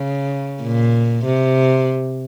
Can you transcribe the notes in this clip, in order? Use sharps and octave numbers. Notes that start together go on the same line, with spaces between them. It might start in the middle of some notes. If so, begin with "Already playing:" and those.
Already playing: C#3
A#2
C3